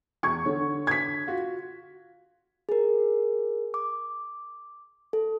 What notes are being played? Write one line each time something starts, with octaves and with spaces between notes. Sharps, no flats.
E2 C#6 G#6
D3 C#5
G#6 B6
F4 F#4
G#4 A#4
D6
A4